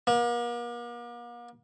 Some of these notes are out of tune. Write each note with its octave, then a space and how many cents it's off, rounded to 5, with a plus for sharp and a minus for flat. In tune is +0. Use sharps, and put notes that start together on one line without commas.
A#3 +40